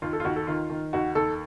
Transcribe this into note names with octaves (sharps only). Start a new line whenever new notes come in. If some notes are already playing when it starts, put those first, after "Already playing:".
D#2 F4
A4
F4
D#2 F#4
A4
D#3 F4
D#3
D#2 F#4
D#2 A4